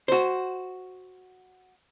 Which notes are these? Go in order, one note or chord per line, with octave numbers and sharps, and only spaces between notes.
F#4 C5